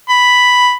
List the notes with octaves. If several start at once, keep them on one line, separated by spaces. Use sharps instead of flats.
B5